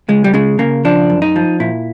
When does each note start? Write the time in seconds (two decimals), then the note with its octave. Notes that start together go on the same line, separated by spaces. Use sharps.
0.09 C#2 G#3
0.24 G3
0.34 C#3 G#3
0.59 C#3 A#3
0.85 F3 D4
1.10 F#2
1.22 D#4
1.36 F3
1.60 A#2 E4